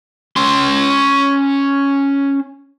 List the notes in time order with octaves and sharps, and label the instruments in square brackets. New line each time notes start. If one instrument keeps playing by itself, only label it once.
[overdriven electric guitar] C#4 C6